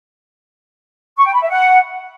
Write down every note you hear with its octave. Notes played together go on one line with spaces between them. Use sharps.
C#6
G5
B5
E5
F#5